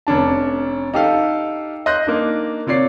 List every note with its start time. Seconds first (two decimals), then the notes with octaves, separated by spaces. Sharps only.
0.07 F1 C#4 D4 A5
0.94 D#4 G4 A4 F5
1.86 D#5 C6 F#6 G6 A#6
2.07 A#3 D4 D#4
2.67 C3 F4 C#5 D5 C7